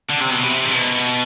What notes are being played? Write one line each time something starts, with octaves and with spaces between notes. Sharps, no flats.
D3
C3
B2
C3
G#2
B2